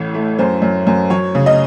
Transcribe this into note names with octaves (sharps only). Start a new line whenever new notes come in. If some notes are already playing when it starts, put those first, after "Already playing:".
Already playing: A1 A2 C#5
A3
F#2 C5
F#2
F#2
F#3 C#5
C#3
D#5